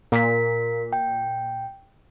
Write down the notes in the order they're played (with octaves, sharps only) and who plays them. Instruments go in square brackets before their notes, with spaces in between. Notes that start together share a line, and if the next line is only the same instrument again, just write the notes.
[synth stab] A#2 [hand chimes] A#4 B6
[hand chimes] G5